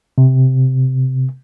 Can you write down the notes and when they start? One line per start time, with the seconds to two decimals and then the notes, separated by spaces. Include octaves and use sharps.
0.18 C3